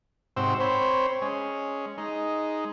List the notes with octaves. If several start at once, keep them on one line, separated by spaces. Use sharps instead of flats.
G#2 C3 C4 F#4 C5 E6
C4 C5 C#5 B5
G#3 C#4
G#3 D#4